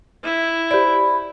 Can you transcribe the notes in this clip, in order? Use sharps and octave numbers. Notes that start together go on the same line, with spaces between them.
E4
G4 C5 D5 B5